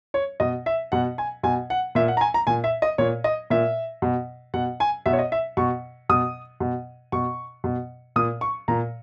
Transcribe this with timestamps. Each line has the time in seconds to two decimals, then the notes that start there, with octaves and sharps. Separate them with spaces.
0.14 C#5
0.40 B2 D#5
0.66 E5
0.92 B2 F#5
1.18 G#5
1.43 B2 G#5
1.70 F#5
1.95 A#2 E5
2.08 F#5
2.17 A#5
2.21 G#5
2.34 A#5
2.47 A#2 G#5
2.64 E5
2.82 D#5
2.98 A#2 C#5
3.24 D#5
3.50 A#2 E5
4.02 B2
4.54 B2 F#5
4.80 G#5
5.06 B2 E5
5.13 C#5
5.19 D#5
5.32 E5
5.57 B2 C#6
6.09 B2 D#6
6.60 B2
7.12 B2 C#6
7.64 B2
8.16 A#2 D#6
8.41 C#6
8.68 A#2 A#5